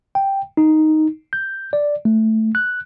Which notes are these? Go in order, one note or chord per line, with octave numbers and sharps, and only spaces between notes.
G5
D#4
G6
D5
A3
F#6